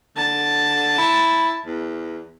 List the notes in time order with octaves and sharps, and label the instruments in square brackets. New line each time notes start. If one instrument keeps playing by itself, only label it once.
[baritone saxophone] D3 [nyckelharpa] A5
[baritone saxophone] E4
E2